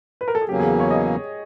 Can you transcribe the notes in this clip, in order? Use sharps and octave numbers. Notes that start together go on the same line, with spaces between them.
B4
A#4
A4
G#4
E2 C#3 F#3 A#3 C#4 G4
G#4
C#5
D#5